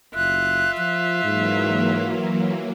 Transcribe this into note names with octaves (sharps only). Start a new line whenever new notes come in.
F#1 F4 E5 F#6
F3 F#6
G#2 E3 F#3 A#3